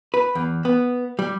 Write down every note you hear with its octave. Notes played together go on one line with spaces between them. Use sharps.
B4
E2
B3
G3